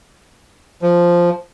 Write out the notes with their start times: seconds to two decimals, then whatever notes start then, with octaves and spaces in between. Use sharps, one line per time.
0.82 F3